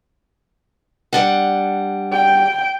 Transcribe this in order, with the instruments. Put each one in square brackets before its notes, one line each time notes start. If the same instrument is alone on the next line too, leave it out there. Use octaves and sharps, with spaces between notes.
[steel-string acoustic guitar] G3 D4 F#5
[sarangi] G5